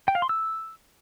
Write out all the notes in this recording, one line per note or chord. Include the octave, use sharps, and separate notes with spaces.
G5
F5
C6
E6